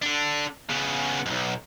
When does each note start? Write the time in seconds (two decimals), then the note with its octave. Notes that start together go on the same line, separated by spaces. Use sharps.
0.02 D3 D4
0.70 C#3 B3
1.26 B1 F2